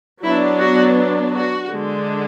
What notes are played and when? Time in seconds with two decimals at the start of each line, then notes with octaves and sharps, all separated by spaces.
0.22 F#3 B3 D4 E4
0.60 F#4
1.34 F#4
1.71 D3 G#3 D4